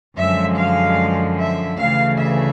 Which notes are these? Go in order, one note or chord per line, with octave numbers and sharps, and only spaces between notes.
F#2 D3 F3 G#3 E5
F5
E5
D2 C#3 E3 F5
E5